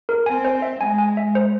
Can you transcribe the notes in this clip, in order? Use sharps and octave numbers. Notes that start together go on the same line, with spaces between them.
A#4
C4 G#5
C5
E5
G#3 G#5
G#5
E5
C5